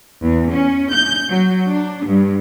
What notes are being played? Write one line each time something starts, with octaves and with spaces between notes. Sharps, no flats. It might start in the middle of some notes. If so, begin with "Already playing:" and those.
E2
C#4
G6
F#3
D4
G2